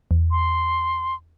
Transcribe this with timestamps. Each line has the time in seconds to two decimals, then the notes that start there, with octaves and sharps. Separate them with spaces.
0.11 E2
0.31 C6